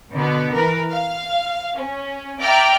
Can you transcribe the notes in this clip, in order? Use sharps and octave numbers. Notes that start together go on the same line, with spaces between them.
B2 D3 B3
E3 A#4 B4
F5
C#4
D5 E5 G5 A#5 D6 F6